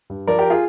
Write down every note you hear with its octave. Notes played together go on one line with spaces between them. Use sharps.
G2
F3 A#4 D5
G4 A#4
F4 G#4